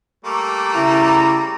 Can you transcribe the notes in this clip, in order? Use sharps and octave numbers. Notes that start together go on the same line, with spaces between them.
G3 A3 A#3
C#3 E4 A#5